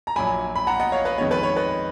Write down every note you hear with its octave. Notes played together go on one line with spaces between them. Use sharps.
A#5
A#1 A#2 F#3 G#5 B5
B5
F#5 A#5
D#5 F#5
C#5 F5
B4 D#5
F2 D#3 G#3 B3 C#5
B4
C#5
B4 D#5